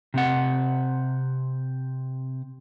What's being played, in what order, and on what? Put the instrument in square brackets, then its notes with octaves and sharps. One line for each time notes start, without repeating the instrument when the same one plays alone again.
[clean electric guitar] C3 C4 F#5